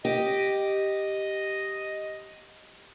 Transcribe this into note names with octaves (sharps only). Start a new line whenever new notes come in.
G4 D#5